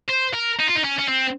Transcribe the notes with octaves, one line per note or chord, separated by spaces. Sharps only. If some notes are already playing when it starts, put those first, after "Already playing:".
C5
A#4
D#4
F4
D#4
C#4
C#4
C4